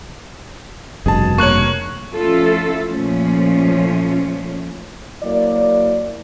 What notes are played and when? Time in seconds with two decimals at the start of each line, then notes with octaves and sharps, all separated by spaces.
1.06 F1 G2 B2 G#4 A5
1.38 A#3 C#5 C#6 F#6 F#7
2.13 F3 A3 C#4 E4 F4 A4
2.90 A#2 F3 A3 C#4
5.23 F#3 A#3 E4 D5